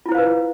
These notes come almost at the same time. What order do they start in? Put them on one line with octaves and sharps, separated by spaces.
F4 E4 C5 F5 B4